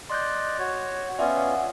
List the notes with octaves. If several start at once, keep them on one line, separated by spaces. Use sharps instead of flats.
D5 D#5 C6 F#6 G6
F#4 C#5
B3 C#4 F4 D5 E5 F#5